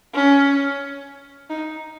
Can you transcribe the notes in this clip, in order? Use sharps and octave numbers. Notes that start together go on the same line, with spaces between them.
C#4
D#4